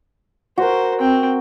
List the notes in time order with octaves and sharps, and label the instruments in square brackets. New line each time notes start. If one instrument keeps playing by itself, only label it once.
[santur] F#4 A#4 [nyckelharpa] C5
[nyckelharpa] C4 G5